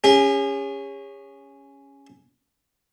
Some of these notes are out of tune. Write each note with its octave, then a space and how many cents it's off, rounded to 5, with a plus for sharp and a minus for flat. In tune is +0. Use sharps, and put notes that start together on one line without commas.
C#4 +0 G#4 -45